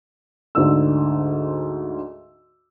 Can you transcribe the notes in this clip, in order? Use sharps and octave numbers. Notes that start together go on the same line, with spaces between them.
D2 G#2 D3 E6